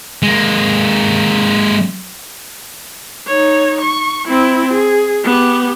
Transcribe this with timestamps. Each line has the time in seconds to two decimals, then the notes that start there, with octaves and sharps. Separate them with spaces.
0.23 G#3 A#3
3.27 D#4 C#5
3.81 C#6
4.28 C4 E4
4.73 G#4
5.24 B3 G4